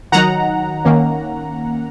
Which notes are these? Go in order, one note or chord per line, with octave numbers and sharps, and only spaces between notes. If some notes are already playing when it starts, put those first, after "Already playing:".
D#3 F#3 D#4 F#5 A#5
D#3 A#3 C#4